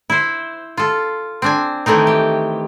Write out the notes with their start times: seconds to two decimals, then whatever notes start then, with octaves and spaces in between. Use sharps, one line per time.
0.10 E4 C5
0.77 F4 A4
1.42 C4 D4 G#5
1.86 D#3 E3 A3 C4 D#4
2.07 G4